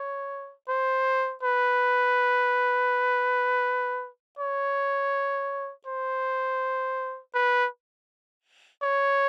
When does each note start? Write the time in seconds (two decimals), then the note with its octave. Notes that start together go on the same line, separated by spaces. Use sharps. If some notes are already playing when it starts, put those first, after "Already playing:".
Already playing: C#5
0.68 C5
1.43 B4
4.39 C#5
5.86 C5
7.34 B4
8.83 C#5